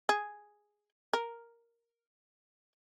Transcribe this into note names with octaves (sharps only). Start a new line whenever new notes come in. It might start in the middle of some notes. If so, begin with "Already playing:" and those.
G#4
A#4